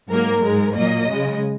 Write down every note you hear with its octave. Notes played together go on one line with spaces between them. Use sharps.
G#2 F#3 A#3 A#4
G#2 G#3
A#2 F#3 A#3 D#5
C#3 G#3